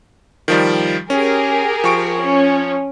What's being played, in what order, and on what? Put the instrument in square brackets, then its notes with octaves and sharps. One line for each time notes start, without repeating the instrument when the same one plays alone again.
[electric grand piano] D#3 F3 G3
[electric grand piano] C#4 [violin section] G4 G#4 A#4
[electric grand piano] F3 C#6 D7
[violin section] C#4